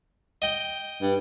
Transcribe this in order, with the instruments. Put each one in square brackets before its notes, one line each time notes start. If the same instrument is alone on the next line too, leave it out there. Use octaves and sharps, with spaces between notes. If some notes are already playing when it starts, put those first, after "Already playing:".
[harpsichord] D#5 G5
[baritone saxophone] G2